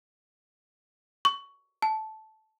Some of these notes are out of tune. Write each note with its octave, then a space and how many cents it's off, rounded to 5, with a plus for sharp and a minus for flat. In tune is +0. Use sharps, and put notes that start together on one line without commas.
C#6 +15
A5 -10